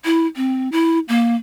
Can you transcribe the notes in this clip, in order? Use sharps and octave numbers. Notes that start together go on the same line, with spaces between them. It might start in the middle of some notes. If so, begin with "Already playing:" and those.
E4
C4
E4
A#3